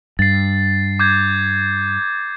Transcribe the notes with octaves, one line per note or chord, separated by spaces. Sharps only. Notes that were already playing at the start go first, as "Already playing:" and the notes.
G2 A6 C7
D6 G6 G#6